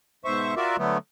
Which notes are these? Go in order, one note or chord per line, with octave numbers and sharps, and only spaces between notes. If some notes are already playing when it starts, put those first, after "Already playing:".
G#2 B2 C5 E5 C#6
F4 F#4 A#4 D5 E5
D3 F#3 A3 B3